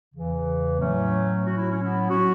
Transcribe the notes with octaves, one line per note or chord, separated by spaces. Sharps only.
E2 C#3 E3
A2 F#3 A3 C#4
A2 F#3 F#4
E4
C#4
B3 E4
F#3 C#4 F#4